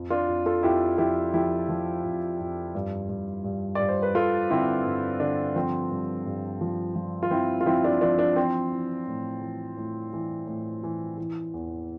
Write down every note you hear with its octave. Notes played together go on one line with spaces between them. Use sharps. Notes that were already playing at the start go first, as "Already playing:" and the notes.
Already playing: F2
D4 F4
F2
F4 A4
F2 E4 G4
F3 E4 G4
F3 E4 G4
F3
F2
F2
G2
G2
G2
G2 D5
C5
B4
G2 F4 A4
D3 C4 E4
G2
D3 D4
F3 C4
G2
G2
F3
F3
F4
F3 C4 E4
F4
F3 C4 E4
D4 F4
F3 D4 F4
D4
E3 C4
E3
A2
E3
A2
E3
A2
E3
E3
E2